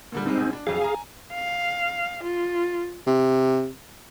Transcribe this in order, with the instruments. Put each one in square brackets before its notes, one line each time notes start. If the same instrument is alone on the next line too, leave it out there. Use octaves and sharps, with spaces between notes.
[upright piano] A#2 D3 G3
[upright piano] G3 G#3 [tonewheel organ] C4 D#4
[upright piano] B1 G#4
D4
[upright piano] F2 F#3 [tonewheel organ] G#4 F5
[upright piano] G#5 A#5
[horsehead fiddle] F5
F4
[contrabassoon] C3